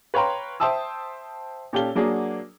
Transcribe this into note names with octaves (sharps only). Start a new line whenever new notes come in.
B4 C#5 F5 G5 A#5 C6
C5 E5 G5 A5 D#6 E6
A#2 C#4 G4 A4 F5 G7
F#3 A#3 D4 F#4 G#4